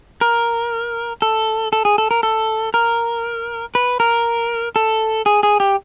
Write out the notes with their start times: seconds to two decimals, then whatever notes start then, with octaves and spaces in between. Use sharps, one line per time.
0.21 A#4
1.22 A4
1.73 A4
1.85 G#4
1.98 A4
2.11 A#4
2.23 A4
2.74 A#4
3.75 B4
4.00 A#4
4.76 A4
5.26 G#4
5.43 G#4
5.60 G4